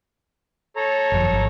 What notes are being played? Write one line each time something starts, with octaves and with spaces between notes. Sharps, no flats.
A4 C#5 A#5
G1 F#2 F3
G#1